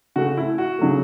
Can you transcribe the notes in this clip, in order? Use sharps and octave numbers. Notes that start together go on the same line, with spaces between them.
C#3 A3 F#4
E4
F#4
C#3 F#3 A3